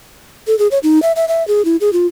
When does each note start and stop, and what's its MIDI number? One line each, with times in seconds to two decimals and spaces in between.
0.47 0.58 69
0.59 0.68 68
0.71 0.79 73
0.83 1.02 63
1.02 1.12 76
1.16 1.28 76
1.28 1.46 76
1.48 1.65 68
1.65 1.76 64
1.81 1.93 68
1.93 2.07 65